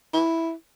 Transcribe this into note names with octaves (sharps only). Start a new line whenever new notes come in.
E4